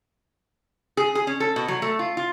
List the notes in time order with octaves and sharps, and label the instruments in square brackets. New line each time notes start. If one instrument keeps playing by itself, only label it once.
[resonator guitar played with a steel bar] G#4
G#4
C#4
A4
B2
F#3
A3
F4
F4